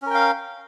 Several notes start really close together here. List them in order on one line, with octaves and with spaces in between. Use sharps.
C#4 A#4 G5 F5